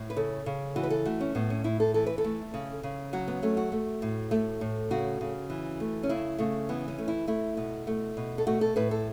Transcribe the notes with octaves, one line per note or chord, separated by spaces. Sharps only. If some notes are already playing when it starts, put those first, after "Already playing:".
Already playing: A2
B4
C#3 A4
C#3
E3 F#4
B4
A4
A3 F#4
C#4
A2 B3
C#4
A2 E4
A4
E3 A4
B4
A4
A3
C#3
C#3
F#3 F#4
B3
A3 C#4
F#4
A3
A2
A3
A2
C#3 F#4
C#3
E3
A3
C#4
C#3 E4
C#3 A3
E3 B3
C#4
A3
E4
A3 E4
B2
A3
B2
A4
A3 F#4
A4
A2 B4
A4